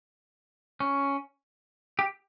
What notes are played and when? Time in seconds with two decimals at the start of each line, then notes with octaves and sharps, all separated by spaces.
0.80 C#4
1.99 G4